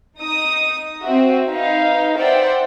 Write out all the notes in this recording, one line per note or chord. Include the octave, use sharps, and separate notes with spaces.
D#4 D#6
C4 F#4 E5
D#4 B4 F5
C5 D5 E5 F#5 G5